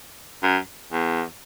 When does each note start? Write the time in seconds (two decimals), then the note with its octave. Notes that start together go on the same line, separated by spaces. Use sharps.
0.43 F#2
0.92 E2